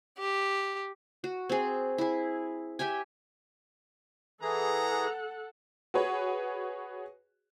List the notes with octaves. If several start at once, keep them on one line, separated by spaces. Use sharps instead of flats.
G4
F#4
C4 G#4
E4 G#4
G4 E5 G5 G#5
E3 G#4 A4 F#5 A#5
F#4 G#4 B4 C#5